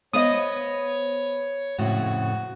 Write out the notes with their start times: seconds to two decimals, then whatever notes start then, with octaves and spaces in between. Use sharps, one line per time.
0.13 B3 C5 C#5 D#5 F5 D#6
1.78 F2 A2 C#3 F#4